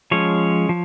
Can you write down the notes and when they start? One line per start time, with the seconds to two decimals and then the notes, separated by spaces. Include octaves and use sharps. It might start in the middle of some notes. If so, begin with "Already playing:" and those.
0.11 F3 G#3 C#4 C#5
0.69 F3